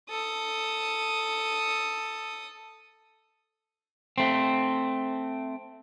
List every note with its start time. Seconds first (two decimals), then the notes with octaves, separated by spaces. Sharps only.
0.10 A4 D#6
4.18 A3 C4